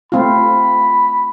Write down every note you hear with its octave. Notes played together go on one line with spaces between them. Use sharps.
A3 C4 F4 B5